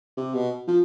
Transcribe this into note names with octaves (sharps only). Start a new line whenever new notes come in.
C3
B2
F3